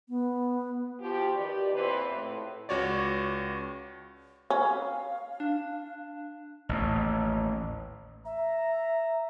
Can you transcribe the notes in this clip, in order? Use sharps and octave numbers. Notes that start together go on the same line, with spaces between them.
B3
F3 F#4 G4
D#3 G4 B4 D5
E2 A#2 E3 C4 B4 C5
A2
C#2 F#4 C#5 D5
C#4 F5
D4
A1 D#2
E5 A#5